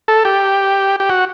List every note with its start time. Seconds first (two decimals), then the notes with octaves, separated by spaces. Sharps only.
0.08 A4
0.25 G4
1.00 G4
1.10 F#4